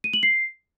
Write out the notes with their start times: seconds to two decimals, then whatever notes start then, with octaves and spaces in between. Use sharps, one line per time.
0.04 D#7
0.13 F#7
0.23 C7